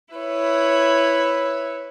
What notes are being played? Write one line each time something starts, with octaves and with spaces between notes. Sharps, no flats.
E4 B4 C#5